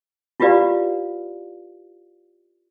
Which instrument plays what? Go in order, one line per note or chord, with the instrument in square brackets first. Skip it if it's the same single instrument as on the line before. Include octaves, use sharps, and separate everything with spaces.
[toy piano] E4 F4 G4 B4 D5 F5